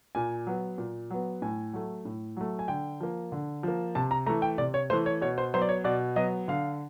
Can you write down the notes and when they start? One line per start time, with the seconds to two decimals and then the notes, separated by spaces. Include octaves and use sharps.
0.15 A#2 G#5
0.47 F#3 B3
0.78 A#2
1.10 F#3 B3
1.42 A2 G#5
1.73 F#3 A3
2.05 A2
2.37 F#3 A3
2.59 G#5
2.68 D3 G5
3.00 F3 A#3
3.32 D3
3.63 F3 A#3
3.95 C3 A5
4.11 A#5
4.26 E3 A3 A#5
4.42 G5
4.58 C3 D5
4.74 C#5
4.90 E3 A3 C5
5.06 C#5
5.21 B2 C#5
5.38 C5
5.54 F#3 B3 C5
5.62 D5
5.69 C#5
5.84 B2 D5
6.16 F#3 B3 D#5
6.48 D3 F5